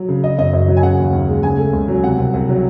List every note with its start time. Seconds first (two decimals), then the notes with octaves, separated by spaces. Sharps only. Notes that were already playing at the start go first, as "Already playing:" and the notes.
Already playing: F#3
0.09 C#3
0.24 C#3 D#5
0.38 F#2 D#5
0.53 F#2 D#5
0.68 F#3
0.77 G#5
0.83 C#3 F#5
0.98 D#2
1.13 D#2
1.28 G#3
1.43 C#3 G#5
1.58 A3
1.73 C#2
1.88 F#3
2.03 C3 F#5
2.18 C2
2.34 C2
2.49 F#3